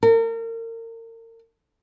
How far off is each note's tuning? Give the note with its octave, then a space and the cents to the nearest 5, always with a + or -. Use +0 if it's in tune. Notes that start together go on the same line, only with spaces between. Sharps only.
A#4 -35